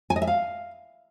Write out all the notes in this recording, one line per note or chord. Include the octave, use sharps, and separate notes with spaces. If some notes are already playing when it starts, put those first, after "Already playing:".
G#5
D#5
E5
F5